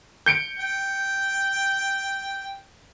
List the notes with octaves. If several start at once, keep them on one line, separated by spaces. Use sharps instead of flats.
G6 C#7 D7
G5